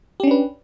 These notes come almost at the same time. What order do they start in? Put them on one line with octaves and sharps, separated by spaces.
G4 C#4 D4 B4